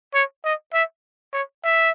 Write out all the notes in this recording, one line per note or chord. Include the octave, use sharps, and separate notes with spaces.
C#5
D#5
E5
C#5
E5